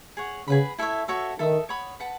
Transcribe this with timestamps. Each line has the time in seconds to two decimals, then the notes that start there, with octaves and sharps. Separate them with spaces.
0.17 G#4 C#5 F#5
0.48 C#3 G#4 B4 F#5 B5
0.78 E4 A4 C#5 E5
1.08 F#4 A4 C#5 E5
1.38 D#3 A4 E5 B5 D#6
1.69 C#5 F#5 B5 D#6
2.00 B4 F#5 A5